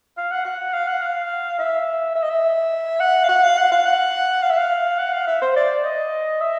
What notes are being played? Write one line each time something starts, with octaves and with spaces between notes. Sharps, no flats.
F5
F#5
F#5
F5
F#5
F5
E5
E5
D#5
E5
F#5
F5
F#5
F5
F#5
F5
F#5
F5
E5
F5
F#5
F5
E5
C5
D5
D#5
E5